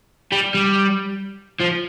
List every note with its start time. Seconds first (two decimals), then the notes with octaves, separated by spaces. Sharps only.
0.32 G3
0.54 G3
1.61 F3